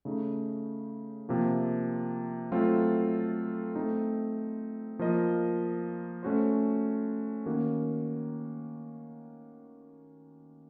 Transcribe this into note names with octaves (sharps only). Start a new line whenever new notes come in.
C#3 A3 D#4
C3 F3 A#3
F#3 A3 C4 F4 A4
A3 C4 D#4
F3 A#3 F4 A#4 D#5
A3 C#4 F#4 C5
D#3 A#3 C#4 F#4 A#4